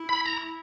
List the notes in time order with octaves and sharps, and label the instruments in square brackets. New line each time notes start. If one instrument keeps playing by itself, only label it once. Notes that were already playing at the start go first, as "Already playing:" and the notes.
Already playing: [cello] E4
[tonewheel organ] B5
A#5